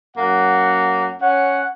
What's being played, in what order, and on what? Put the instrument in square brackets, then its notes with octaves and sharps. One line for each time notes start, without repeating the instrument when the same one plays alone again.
[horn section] F#2 A#3 F#5
C#4 F#5